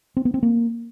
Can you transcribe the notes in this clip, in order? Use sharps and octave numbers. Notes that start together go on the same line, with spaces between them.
C4
B3
C4
A#3